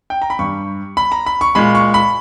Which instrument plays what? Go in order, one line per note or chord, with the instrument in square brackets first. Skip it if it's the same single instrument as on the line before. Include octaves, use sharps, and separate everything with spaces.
[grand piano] G5
A#5
B5
G2 G3 C#6
B5
A#5
B5
C#6
A#2 G#3 B5
C#6
B5